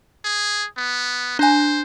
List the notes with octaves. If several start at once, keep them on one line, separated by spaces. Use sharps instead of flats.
G#4
B3
D4 C5 G#5